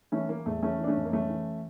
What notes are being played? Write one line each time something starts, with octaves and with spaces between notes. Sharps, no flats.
E3 A3 C#4
E3 A#3
E2 A3
E3 A3 C#4
E3
D4
A3 C#4
F2
A#3
E3 A3 C#4
E3